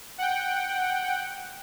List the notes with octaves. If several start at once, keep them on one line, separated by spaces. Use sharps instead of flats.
F#5 G5